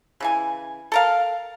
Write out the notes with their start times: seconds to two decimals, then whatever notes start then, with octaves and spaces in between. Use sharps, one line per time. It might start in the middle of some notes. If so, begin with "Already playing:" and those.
0.20 C#3 E3 G#5
0.92 A4 A#4 F5